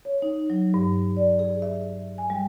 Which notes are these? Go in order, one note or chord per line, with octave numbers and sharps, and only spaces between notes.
C#5
D#4
F#3
G2
D5
G#4
E5
G#5
G3